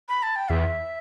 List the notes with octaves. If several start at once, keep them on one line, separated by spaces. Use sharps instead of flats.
B5
A5
G5
E2 E5